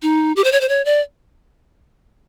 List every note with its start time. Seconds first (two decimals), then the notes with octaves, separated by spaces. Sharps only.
0.02 D#4
0.36 G4
0.44 C5
0.52 C#5
0.61 C5
0.69 C#5
0.85 D5